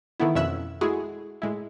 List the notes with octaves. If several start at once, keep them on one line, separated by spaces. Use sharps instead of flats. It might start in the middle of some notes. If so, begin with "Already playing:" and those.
D#3 E3 A3 B3 E4
F2 B2 C#4 E5 E6 F#6
G#3 A3 E4 F#4 G#4
A2 G#3 E4